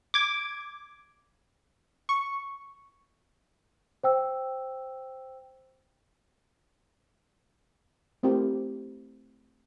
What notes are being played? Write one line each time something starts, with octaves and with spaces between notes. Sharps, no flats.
D6 G#6
C#6
C5 G5 E6
A3 C4 E4 G4 A#4